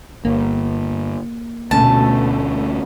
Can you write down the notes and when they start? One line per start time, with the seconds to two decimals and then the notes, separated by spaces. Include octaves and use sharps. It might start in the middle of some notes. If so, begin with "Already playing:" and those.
0.25 G1 A#3
1.71 D2 B2 A3 C#4 A5